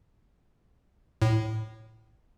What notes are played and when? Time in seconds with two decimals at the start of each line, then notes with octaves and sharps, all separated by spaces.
1.22 A2